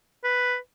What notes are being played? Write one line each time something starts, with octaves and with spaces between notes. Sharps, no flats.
B4